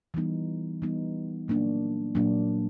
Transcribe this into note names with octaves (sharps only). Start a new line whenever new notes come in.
E3 G3 B3 D#4
E3 G3 B3 D#4
A#2 F#3 A#3 D4
A#2 F#3 A#3 D4